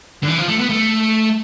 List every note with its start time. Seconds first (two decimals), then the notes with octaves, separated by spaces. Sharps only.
0.23 D3
0.28 E3
0.38 F3
0.48 A3
0.59 B3
0.70 A3